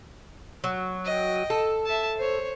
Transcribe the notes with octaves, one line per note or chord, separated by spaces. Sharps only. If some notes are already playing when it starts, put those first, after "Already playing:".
F#3
D#5 G5
A4
E5 A5
C5 C#5